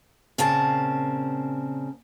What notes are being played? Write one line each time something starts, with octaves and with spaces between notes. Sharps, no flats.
A#2 C#3 C4 C#5 A5